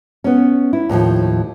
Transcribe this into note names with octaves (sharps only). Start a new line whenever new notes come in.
B3 C#4
E4
D#2 A2 D3 F3